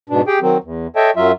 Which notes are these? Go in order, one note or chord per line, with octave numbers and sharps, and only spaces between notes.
G#2 B2 D4
G4 G#4 G5
D#3 F#3 C4
E2
A4 C#5 D#5 E5 G5 A5
F#2 F#3 F4 E5